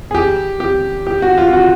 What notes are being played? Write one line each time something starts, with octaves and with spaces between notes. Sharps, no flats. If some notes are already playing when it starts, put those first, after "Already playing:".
G#4
G4
G4
G4
F#4
F4
F4
F#4